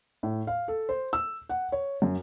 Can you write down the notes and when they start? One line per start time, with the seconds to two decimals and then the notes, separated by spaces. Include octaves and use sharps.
0.23 A2
0.47 F5
0.68 A4
0.89 C5
1.13 E6
1.49 F#5
1.72 C#5
2.02 F#2